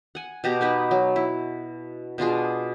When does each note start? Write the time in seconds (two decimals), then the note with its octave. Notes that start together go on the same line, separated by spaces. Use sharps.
0.15 F#5 G#5
0.44 B2 G4 A#5
0.61 B3 D#4 B4
0.91 F#3
1.16 E4
2.18 B2 D4 F4 G#4